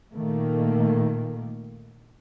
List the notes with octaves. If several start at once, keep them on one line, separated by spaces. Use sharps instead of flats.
A#2 D#3 A3 A#3